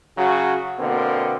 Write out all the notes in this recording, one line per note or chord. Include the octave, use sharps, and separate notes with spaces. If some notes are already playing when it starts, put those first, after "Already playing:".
C#3 F#3 F#4
B2 D3 A#3 C4